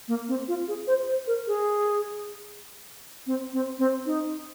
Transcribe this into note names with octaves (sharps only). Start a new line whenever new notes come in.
A#3
C4
F4
G#4
C5
C5
A#4
G#4
C4
C4
C4
D#4